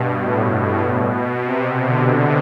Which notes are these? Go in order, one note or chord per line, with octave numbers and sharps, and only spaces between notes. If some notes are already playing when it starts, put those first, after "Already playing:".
Already playing: G2 B2
A2
B2
C3
D3